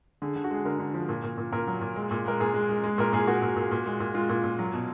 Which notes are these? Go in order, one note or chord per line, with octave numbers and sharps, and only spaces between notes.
D3 G#4
D3
F#4
G#3 G#4
D3 A#4
D3
F3
A#2
A#2
A#2
A#2 A#4
F#3
A#2
G#3
A#2
G#3 A#4
A#2 G#4
G#3
G#3
G#3
A#2 A#4
A#2 G#4
A#2 F#4
A#2
A#2
A#2
G#3
A#2
G#3 F4
A#2
A#2
F#3
B2